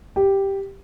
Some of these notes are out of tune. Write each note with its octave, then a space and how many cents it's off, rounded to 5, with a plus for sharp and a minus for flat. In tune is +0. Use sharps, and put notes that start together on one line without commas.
G4 +0